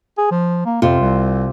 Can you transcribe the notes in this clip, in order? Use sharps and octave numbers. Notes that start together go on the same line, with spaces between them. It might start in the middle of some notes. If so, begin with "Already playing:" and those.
G#4
F3
A#3
F2 C3 F4
C2